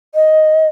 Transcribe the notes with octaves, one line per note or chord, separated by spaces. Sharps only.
D#5